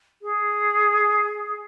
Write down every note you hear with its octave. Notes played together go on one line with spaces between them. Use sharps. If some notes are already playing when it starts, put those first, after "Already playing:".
G#4